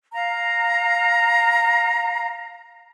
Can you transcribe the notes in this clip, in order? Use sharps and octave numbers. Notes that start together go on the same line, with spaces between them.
F5 A#5